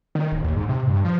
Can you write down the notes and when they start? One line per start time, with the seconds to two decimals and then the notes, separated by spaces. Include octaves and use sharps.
0.15 D#3
0.32 D1
0.44 D#2
0.56 G#2
0.69 C3
0.87 G2
1.05 F3